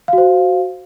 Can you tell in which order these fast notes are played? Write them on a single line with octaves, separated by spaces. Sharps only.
F5 F#4 C5